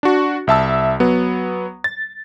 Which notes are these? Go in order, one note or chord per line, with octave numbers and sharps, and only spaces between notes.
D4 F#4
C2 E5 A5 E6
F#3 B3
A6